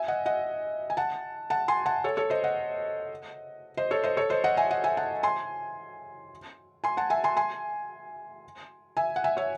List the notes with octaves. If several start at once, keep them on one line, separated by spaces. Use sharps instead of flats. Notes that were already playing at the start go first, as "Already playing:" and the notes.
Already playing: E5 G#5
D#5 F#5
D#5 F#5
G#5
F#5 A5
F#5 A5
G#5 C6
F#5 A5
A4 C#5
A4 C#5
C5 D#5
D#5 F#5
C5 D#5
A4 C#5
C5 D#5
A4 C#5
C5 D#5
D#5 F#5
E5 G#5
D#5 F#5
E5 G#5
F#5 A5
G#5 C6
G#5 C6
F#5 A5
E5 G#5
G#5 C6
G#5 C6
E5 G#5
F#5
E5 G#5
C#5 E5